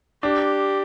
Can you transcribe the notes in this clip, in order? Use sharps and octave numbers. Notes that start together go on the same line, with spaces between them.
D4 G4